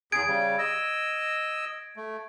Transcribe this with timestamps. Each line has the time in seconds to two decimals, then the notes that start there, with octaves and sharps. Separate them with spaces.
0.12 E2 G#4 G#6 D7
0.27 C#3 G3
0.58 D#5 E6
1.97 A3